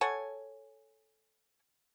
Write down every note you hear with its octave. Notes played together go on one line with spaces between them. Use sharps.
A4 C#5 F#5 G#5